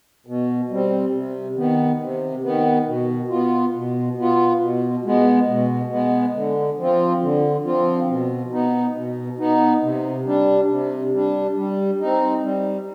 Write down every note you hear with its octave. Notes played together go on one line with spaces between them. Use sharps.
B2
G3 C4
C3
D#3 B3
C3
D#3 B3
B2
B3 F4
B2
B3 F4
B2
G#3 B3
B2
G#3 B3
D3
F3 C4 F4
D3
F3 C4 F4
B2
B3 D#4
B2
B3 D#4
C3
G3 D4
C3
G3 D4
G3
C4 D#4
G3